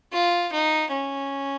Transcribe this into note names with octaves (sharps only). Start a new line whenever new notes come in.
F4
D#4
C#4